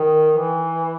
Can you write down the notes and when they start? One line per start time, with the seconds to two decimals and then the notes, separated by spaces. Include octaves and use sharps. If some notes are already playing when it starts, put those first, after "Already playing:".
Already playing: D#3
0.37 E3